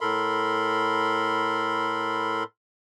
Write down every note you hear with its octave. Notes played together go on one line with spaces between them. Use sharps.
A2 A4 A#4 B5 C6